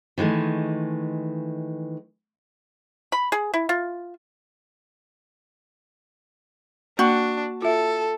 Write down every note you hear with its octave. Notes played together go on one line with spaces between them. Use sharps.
D#3 E3 G#3 A3
B5
G#4
E4
F4
A#3 D4 F#4
F4 A4 E5